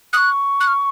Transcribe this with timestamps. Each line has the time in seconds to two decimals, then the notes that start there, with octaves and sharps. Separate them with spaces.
0.13 C#6 D#6 F#6
0.60 F#6
0.67 F6